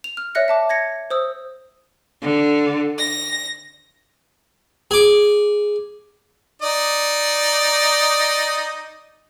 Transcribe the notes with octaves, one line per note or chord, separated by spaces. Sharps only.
F7
F6
C#5 D5 E5 F#6 A#6 C#7
E5 A5 D6
G#6 A#6 C#7
C5 D#6 E6
D3
A#6
G#4 D6
D#4 D5 D#5